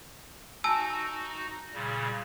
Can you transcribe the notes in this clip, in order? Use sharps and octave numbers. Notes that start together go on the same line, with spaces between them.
D#4 F#4 G#5 A5 E6
A#2 C#3 G3